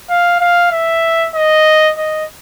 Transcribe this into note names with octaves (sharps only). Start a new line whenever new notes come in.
F5
F5
E5
D#5
D#5